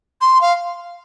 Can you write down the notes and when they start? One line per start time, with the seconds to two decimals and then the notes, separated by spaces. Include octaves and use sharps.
0.21 C6
0.41 F5